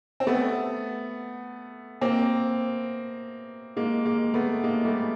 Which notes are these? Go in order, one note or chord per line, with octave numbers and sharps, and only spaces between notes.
C4
A3 B3
A#3 C4
G#3 A#3
G#3 A#3
A3 B3
G#3 A#3
G3 A3